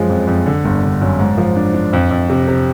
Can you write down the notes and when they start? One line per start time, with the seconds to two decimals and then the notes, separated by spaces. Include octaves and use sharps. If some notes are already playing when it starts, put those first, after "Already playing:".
Already playing: F#2 F3 G#3
0.09 F2
0.27 F2
0.46 D3
0.65 G1
0.83 D3
1.01 F#2
1.19 G#2
1.38 F3
1.56 D4
1.74 D4
1.93 F2
2.11 F2
2.29 C3
2.48 C3